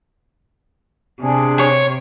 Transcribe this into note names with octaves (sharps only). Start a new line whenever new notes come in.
C3 D4 G#4
C#5